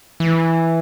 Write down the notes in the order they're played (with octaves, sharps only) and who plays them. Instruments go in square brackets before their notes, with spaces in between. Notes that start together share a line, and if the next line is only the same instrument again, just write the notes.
[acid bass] E3